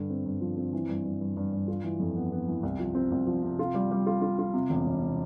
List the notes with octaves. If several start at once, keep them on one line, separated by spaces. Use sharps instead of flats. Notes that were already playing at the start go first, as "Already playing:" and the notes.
Already playing: G2 D3
C4
G2
F3
C4
E3
G2
G2
G2
G2
G2
F4
E3
F2
B3
B3
E3
C2
F3
C4
C2
F3
C3
F4
G3
G3
F4
F4
F4
C3
E1
E1
C3